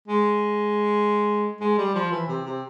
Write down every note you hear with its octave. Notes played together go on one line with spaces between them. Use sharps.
G#3
G#3
G3
F3
E3
C3
C3